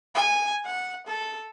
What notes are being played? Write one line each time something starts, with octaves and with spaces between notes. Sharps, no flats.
G#5
F#5
A4